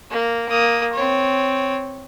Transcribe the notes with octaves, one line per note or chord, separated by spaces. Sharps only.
A#3
A#3 D#6
C4 C#5